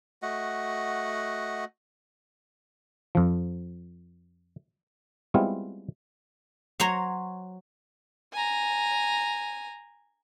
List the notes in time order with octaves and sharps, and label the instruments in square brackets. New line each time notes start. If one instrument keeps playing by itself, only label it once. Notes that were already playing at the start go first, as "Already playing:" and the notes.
[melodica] A3 F#4 D#5 F#5
[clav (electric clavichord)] F2 F3
G3 G#3 B3 C4 E4 F4
[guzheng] F#3 C5 C#5 A#5
[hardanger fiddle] G#5 A#5